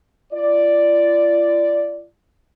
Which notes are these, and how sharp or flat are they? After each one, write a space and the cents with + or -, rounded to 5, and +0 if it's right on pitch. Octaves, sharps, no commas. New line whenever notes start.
F4 -40 D5 +0